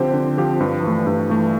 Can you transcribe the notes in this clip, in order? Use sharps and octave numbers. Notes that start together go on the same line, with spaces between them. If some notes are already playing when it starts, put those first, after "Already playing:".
Already playing: D3 F3 C4 G4 C5
D3
F3 C4 G4 C5
G2
E3 A3
G2
E3 A3